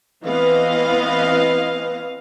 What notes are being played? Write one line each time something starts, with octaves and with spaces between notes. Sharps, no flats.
E3 B3 C4 D#5 F5